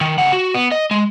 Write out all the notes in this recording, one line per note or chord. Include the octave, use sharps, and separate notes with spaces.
D#3
C#3 F#5
F#4
B3
D#5
G#3